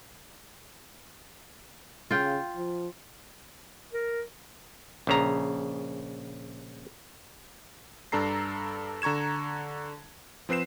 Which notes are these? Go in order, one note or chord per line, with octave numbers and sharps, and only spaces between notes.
C#3 F4 G5
F3
A#4
A#1 C#3 A#5
G2 D4 A4 A#5 C7
D3 A#5 C#6 G#6 E7
F3 C4 B4 C7 E7